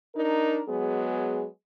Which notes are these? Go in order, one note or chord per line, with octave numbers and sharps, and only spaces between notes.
D4 D#4 A#4
F#3 G#3 B3 G#4